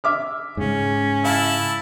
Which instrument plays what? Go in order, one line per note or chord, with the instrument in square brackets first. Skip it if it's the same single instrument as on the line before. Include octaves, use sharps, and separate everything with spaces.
[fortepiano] E5 D6 F6
[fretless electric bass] G#2 C#3 [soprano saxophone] C#4
[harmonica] E4 A5 [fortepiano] F5